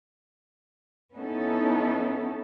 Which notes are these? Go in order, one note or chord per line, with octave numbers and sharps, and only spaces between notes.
B3 C#4 D#4 E4 A4